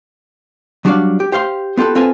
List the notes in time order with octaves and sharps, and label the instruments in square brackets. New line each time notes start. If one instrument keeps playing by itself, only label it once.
[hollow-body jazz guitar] F#3 G3 D4 F#4 D5 F5
G4
G4 C5 F5 C6
B3 F4 G4 A4 B4
C4 F4 A4 B4 G#5